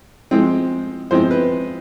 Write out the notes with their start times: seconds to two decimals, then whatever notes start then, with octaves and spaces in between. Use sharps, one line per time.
0.31 F3 G#3 C4
1.11 F3 G#3 C4 C5
1.31 B4